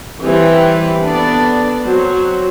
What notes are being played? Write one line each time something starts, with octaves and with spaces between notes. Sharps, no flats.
E3 G3 C4 G4 B4
B3 D4 A4 D5
F#3 C4 F#4 C5